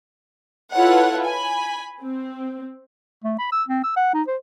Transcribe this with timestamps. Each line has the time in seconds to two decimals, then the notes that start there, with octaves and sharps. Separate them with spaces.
0.74 E4 F4 A4 B4 C#5 F#5
1.26 G#5 B5
2.03 C4
3.24 A3
3.39 B5
3.52 E6
3.68 C4
3.83 E6
3.96 F#5
4.14 D#4
4.28 C5